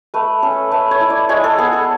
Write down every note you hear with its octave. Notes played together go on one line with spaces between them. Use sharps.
A3 B4
C#4 A4
A3 B4
C#5
E4
D5
G#3 C#5
A4
B3 G#4
A4